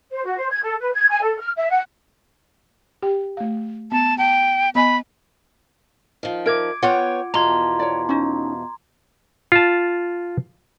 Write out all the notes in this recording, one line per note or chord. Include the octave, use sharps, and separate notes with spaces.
C5
F#4
C5
G#6
A4
B4
G#6
G#5
A4
F6
E5
F#5
G4 G5
A3 F5
B3 A5
G5 A5
B3 D#5 G#5 B5
D#3 F3
A#4 E5 D6 G#6 D7
B3 F4 C#5 F#5 G5
E2 B2 F3 A#5 C6 G#6
C#5 D5
C#4 D#4
F4 A5